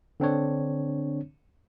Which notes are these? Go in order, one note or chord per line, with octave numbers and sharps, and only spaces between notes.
D3 C4 D4 C#5